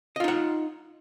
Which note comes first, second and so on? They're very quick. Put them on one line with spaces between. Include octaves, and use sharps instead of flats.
D#5 F4 D#4 F#5